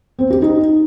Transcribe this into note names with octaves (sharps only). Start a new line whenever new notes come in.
C4
G4
D#4